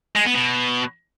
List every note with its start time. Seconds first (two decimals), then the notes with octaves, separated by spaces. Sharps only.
0.16 G#3
0.25 B3
0.35 B2